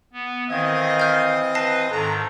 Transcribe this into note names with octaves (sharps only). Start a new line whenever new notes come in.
B3
D#3 E3 C4 D#5 F5 G#6
F6 G6
B4 A5 A#6 C7
G#2 D#3 A4 A#5